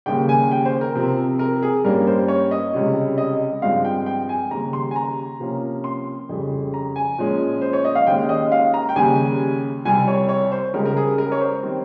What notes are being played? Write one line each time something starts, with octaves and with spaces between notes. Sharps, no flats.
D#2 C#3 G3 A#3 G5
G#5
G5
C5
A#4
C3 F3 C4
A#4
G#4
G2 G3 A#3 C#4 A#4
C5
C#5
D#5
C#2 C3 G3 C#4
D#5
G2 F3 G#3 C4 F5
G5
G5
G#5
D#2 C#3 G3 A#5
C6
G#5
A#5
C3 F3 A#3 C#4
C6
F2 C#3 G3
A#5
G#5
A#2 F3 G#3 C#4
C5
C#5
D#5
F5
D#2 D#3 G#3 C#4 G5
D#5
F5
A#5
G5
D#2 C#3 G3 G#5
C2 C3 G3 G#5
C#5
C#5
C5
C#2 C#3 G3 A#4
A#4
G#4
A#4
C#5
C5
D#3 G3 C4